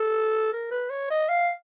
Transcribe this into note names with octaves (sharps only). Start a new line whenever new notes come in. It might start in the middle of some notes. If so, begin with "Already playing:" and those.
Already playing: A4
A#4
B4
C#5
D#5
F5